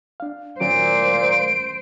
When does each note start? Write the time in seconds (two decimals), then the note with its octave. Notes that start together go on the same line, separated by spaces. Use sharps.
0.20 D4 F5
0.60 A#2 D#3 F#3 C#4 C5 D7